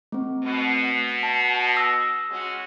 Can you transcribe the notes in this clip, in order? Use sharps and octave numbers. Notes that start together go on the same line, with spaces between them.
A3 C4
B2
A5
D#6 E6 A#6
G#3 C#4 F#4